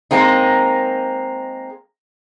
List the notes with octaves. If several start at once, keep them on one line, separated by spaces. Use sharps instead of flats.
G#3 A#3 C4 D#4